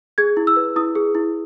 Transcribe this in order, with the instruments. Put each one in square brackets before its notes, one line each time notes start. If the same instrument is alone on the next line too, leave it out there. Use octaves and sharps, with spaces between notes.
[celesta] G#4 G#6
E4
E6
B4
E4 D#6
G#4
E4